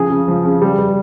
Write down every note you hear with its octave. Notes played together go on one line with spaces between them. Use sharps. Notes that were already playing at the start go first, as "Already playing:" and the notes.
Already playing: C#3 F3 G#4
C#3
F3
C#3
G3
G3